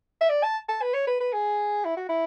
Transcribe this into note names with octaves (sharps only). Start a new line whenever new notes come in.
E5
D5
A5
A5
B4
C#5
B4
B4
G#4
E4
F#4
E4